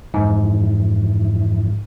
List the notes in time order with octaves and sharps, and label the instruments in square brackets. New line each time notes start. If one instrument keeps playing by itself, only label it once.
[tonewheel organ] F2 E3 [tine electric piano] G#2